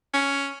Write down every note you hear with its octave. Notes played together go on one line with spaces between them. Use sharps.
C#4